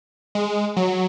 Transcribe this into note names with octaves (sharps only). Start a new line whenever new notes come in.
G#3
F#3